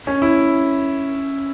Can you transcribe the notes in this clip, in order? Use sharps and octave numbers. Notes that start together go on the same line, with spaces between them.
C#4
E4